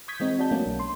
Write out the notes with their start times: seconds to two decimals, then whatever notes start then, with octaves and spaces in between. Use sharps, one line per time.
0.08 C#6 D#6 G6 G#6 B6
0.20 E3 G#3 C4 D#4
0.39 F#4 D5 D#5 A5 G6
0.51 F#3 A3 A#3 C#4 D4
0.66 B1
0.79 C6